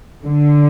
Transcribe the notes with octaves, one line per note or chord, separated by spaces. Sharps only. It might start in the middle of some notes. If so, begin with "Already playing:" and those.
D3